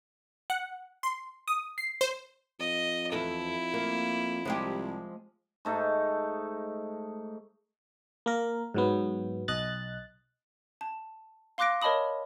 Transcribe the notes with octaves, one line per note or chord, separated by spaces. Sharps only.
F#5
C6
D#6
C7
C5
F2 D#5
E2 E4 A4
A#3
C2 F3 G#3 G4
G#2 A3 D#4
A#3 A#4
G#2 F#3 B3
B1 D#5 F#6 A6
A5
F5 C6 D6 F#6 A#6 D7
A#4 C#5 D#5 A5 B5 D#6